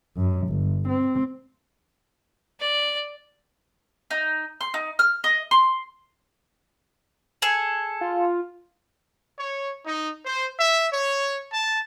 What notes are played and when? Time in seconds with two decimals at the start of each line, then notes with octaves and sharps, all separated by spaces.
0.16 F#2
0.48 G1
0.88 C4
2.60 D5
4.11 D#4
4.61 C6
4.74 D#4
4.99 F6
5.24 D#5
5.51 C6
7.42 G#4 A4 G#5
8.01 F4
9.39 C#5
9.86 D#4
10.26 C5
10.59 E5
10.93 C#5
11.53 A5